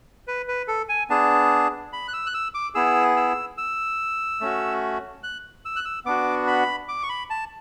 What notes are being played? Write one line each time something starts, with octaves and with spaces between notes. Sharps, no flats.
B4
B4
A4
G#5
B3 D4 G#4 A5
B5
F#6
E6
F#6
E6
D6
B3 E4 G#4 E6
E6
E6
A3 C#4 F#4
F#6
E6
F#6
E6
B3 D4 F#4 D6
B5
D6
C#6
B5
A5